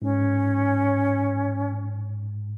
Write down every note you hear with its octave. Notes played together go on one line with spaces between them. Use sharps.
G#2 C#4